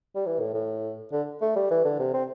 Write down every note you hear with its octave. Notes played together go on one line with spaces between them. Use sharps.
G3
E3
A2
A2
D3
A3
G3
E3
D3
C3
C4